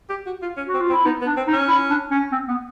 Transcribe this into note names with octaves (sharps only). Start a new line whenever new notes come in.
G4
F#4
F4
C#4
F#4
C4
F4
C4
E4
B3 D#4
B3
D4
C4
D#4
C#4
E4
D4
C#4
C4
B3